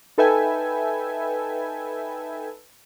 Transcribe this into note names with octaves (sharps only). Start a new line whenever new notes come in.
D#4 A4 B4 E5 G5 G#5